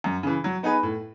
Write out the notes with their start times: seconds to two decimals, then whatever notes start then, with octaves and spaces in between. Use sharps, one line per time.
0.04 F#2
0.23 C#3 E3
0.44 F#3
0.63 B3 D#4 G#4 B4
0.83 A2